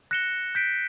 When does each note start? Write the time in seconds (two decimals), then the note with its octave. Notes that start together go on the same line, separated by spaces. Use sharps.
0.11 F#6 A#6 C#7 E7 G7
0.55 G6 B6 D7